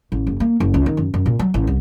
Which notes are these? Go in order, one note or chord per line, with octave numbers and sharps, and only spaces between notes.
A1
F#1
A#3
F#1
C#2
D#3
F#2
F#2
A#2
F#3
A1
C2